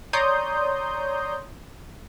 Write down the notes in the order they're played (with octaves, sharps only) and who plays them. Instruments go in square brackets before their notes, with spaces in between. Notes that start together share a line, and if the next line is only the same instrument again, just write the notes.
[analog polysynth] C#5 D5 A#5 C6 D#6 G6